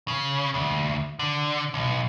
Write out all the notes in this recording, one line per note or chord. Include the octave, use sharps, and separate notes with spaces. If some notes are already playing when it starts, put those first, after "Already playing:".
C#3
D2
D3
B1